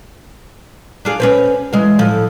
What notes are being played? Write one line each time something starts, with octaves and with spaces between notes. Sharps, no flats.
D4 F4 G#4
C#4 B4 C5
E3 G#3 F5
A2 F3